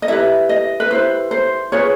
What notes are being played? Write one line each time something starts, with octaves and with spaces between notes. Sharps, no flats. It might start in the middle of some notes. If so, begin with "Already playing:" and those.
D#5
E4 G4 B4 E5
D#5
B4
E4 G4 B4 C5
C5
F4 G#4 B4 C#5